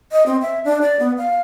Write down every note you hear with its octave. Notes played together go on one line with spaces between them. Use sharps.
D#5
C4
E5
D4
D5
B3
F5